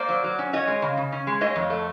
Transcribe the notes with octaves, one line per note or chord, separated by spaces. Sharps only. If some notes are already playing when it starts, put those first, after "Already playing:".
Already playing: A#3 C5 D5
F#3
F#3
C#4
C#4 C#5 D#5
G#3
C#3
C#3
C#4
G#3
A3 C#5 D#5
F2
A3